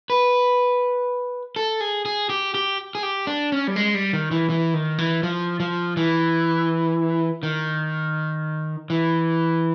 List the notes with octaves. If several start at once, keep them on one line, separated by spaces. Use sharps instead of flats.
B4
A4
G#4
G#4
G4
G4
G#4
G4
D4
C#4
G3
G#3
G3
D#3
E3
E3
D#3
E3
F3
F3
E3
D#3
E3